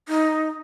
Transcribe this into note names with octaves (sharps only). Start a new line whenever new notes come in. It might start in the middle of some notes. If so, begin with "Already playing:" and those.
D#4